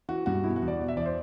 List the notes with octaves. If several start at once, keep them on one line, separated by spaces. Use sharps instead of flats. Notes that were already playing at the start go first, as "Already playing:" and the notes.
E3 F#4
G2 F#4
B2 E4
F#4
E2
D5
B2
E5
E2 D5
C5